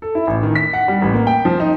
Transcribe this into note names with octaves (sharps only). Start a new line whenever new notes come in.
A4
E4
A1
D#3
B6
F#5
G3
A1
A#3
G5
F3
D#4